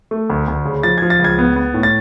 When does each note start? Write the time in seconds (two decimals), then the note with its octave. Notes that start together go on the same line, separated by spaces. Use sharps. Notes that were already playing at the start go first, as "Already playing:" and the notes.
0.11 A3
0.30 D2
0.48 D2
0.65 C#3
0.83 F3 A6
0.98 F3 G#6
1.10 A6
1.19 C#2
1.24 G#6
1.39 B3
1.56 B3
1.74 A2
1.83 A6